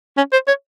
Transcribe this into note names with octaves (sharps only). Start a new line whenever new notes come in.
C#4
C5
C#5